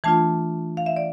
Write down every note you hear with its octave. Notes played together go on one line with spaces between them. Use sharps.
E3 A3 D4 F4 A5
F5
E5
D5